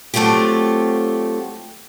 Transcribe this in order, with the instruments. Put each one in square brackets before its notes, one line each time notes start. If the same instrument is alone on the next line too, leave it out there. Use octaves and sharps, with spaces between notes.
[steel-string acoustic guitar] F#3 A3 C4 F4 G4